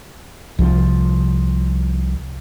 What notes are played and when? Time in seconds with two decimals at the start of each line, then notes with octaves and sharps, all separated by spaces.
0.59 C2 F3